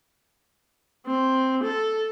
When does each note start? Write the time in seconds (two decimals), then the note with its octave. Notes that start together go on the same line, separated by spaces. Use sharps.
1.07 C4
1.64 A4